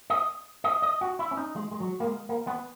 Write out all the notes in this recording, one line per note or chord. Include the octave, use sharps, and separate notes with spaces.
D#5
D#5
D#5
F#4
E4
C#4
D#4
G#3
G#3
F#3
A#3
G#3
A#3
B3